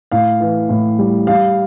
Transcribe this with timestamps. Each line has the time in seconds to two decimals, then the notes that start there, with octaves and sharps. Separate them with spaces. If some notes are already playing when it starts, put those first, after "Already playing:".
0.11 A2 F5
0.40 E3
0.69 A2
0.99 G3
1.27 G3 F5